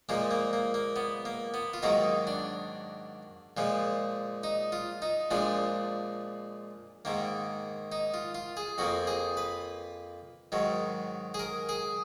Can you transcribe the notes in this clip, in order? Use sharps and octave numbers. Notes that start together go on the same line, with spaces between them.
A#2 F3 G#3 A#3
A#3
A#3
A#3
B3
A#3
B3
F4
G#2 D#3 F#3 A#3 D#4
D4
A#2 F3 G#3
D#4
F4
D#4
A#2 F3 G#3 D4
G#2 D#3 A#3
D#4
F4
F4
G#4
F2 F3 A#3 F#4
G#4
B4
G#2 D#3 F#3
G#4
A#4
G#4